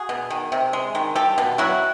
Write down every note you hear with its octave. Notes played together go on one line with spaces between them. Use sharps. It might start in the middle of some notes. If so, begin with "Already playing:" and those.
Already playing: F#4 G#4
B2
D#3
C3
G#3
D#3
G3 G4 A4
B2
F#3 E4 F#4